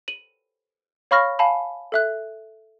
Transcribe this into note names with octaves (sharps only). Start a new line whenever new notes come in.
D#7 F#7
C#5 F5 B5 C#6 F6 A#6
F5 G#5 A5 B5
A4 E5 F#6